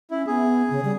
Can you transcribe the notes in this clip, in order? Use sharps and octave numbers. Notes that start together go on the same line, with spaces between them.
C#4 E4
B3 G#4
C#3
G3